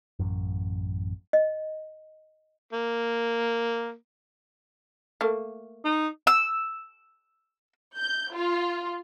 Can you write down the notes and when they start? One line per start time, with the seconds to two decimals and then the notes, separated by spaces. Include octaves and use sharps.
0.20 A1 F#2
1.33 D#5
2.73 A#3
5.21 A3 A#3
5.85 D#4
6.27 E6
7.97 G6
8.33 F4